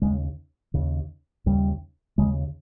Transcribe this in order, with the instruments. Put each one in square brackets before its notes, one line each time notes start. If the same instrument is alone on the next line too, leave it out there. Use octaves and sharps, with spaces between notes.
[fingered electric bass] D#2 C#3 G#3
D#2 C#3
D#2 C#3 G3
D#2 C#3 G#3